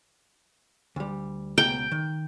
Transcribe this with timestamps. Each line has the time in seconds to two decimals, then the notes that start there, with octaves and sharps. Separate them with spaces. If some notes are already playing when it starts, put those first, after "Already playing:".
0.96 D2 G3
1.58 C#2 B2 G5 A#5
1.92 D#3